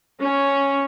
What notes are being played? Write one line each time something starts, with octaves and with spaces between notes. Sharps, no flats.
C#4